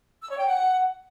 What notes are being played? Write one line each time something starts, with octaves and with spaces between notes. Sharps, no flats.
E6
C#5
G5
F#5